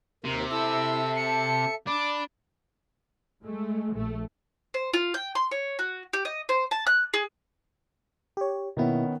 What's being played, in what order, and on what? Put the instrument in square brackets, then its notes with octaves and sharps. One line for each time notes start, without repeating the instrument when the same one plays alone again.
[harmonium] D#2 A#4 [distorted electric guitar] C3
[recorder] E4 [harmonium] A4 E5 [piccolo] E6
[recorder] A5 [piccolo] C#7
[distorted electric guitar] D4 [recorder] B5 [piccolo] D6
[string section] G#3 A3
A#1 A3
[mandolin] C5
F4
G5
C6
C#5
F#4
G4
D#5
C5
A5
F#6
G#4
[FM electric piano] G4 C#5
[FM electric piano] B2 A#3 E4 [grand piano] D#3 B3 C#4